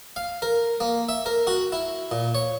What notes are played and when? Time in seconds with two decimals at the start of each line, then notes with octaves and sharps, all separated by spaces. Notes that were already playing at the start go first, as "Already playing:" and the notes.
0.16 F5
0.42 A#4
0.80 A#3
1.09 E5
1.26 A#4
1.47 F#4
1.72 E4
2.11 A#2
2.35 C#5